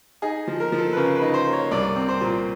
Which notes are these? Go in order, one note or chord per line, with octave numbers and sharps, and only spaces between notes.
D#4 G#4
F3
A#4
F3
A4
B4
C#3 A#4
B4
D#4
C5
A#3
C#5
C2 D5
C4
C5
A#2